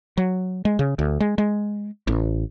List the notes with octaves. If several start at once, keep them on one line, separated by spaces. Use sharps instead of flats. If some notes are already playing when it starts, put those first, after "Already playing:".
F#3
G#3
C#3
D2
G#3
G#3
A1